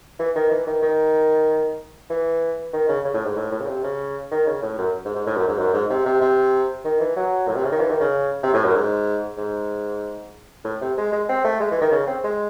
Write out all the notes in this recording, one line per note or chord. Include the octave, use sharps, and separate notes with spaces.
E3
D#3
E3
D#3
D#3
E3
D#3
C#3
C#3
A2
G#2
A2
A2
C#3
C3
C#3
D#3
C#3
A2
F#2
G#2
G#2
A2
F#2
G#2
F#2
G#2
C3
C3
C3
D#3
E3
F#3
A2
C3
C#3
D#3
E3
D#3
C#3
C3
A2
F#2
G#2
G#2
A2
C3
G#3
G#3
C4
A3
G#3
E3
D#3
C#3
C4
G#3